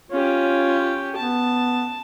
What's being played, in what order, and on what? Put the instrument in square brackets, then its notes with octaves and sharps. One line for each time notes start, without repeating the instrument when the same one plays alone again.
[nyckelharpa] C#4 G4 [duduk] F4
[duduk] B3 [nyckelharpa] A5